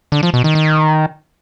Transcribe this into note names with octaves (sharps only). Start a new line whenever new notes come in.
D3
F3
B2
D#3
D#3